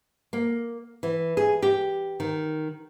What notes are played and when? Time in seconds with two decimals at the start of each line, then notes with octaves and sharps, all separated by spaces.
0.33 A#3
1.03 E3
1.37 G#4
1.62 G4
2.20 D#3